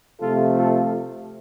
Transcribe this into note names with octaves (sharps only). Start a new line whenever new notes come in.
C3 F3 A3 F4 A4
F4 A4